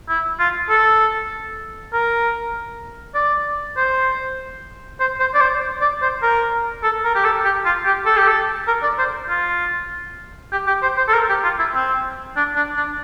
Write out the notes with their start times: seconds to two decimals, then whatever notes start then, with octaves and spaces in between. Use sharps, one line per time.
0.09 E4
0.39 F4
0.69 A4
1.93 A#4
3.15 D5
3.77 C5
5.00 C5
5.20 C5
5.34 D5
5.41 C5
5.81 D5
6.02 C5
6.23 A#4
6.83 A4
7.04 A#4
7.15 G4
7.24 A4
7.45 G4
7.66 F4
7.85 G4
8.06 A4
8.17 G4
8.27 A4
8.67 A#4
8.82 D5
8.99 C5
9.29 F4
10.52 G4
10.67 G4
10.82 C5
10.98 C5
11.08 A4
11.14 A#4
11.29 G4
11.43 F4
11.59 E4
11.74 C4
12.36 D4
12.56 D4
12.77 D4